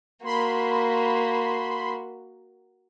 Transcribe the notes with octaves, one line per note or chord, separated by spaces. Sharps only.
A#3 F#4 B5 C6